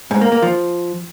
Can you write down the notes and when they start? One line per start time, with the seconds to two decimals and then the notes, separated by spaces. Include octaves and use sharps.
0.11 G#2
0.21 A#3
0.32 A#3
0.42 F3